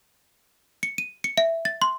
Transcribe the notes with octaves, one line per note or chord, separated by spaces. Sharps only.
C#7
D#7
C#7
E5
A6
C6